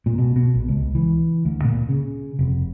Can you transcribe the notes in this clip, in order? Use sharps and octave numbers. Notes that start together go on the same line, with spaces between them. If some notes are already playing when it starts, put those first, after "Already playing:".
A#2
B2
B2
A#1
C#2
E3
D2
A#2
C#3
F1